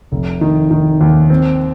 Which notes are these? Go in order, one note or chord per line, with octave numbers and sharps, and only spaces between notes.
F1
D#3
D#3
D#2
C4